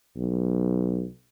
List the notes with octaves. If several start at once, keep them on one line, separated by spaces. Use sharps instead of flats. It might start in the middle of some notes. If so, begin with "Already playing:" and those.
B1